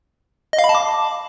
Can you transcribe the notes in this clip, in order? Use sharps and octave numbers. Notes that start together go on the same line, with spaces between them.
D#5
F5
B5
A5
D6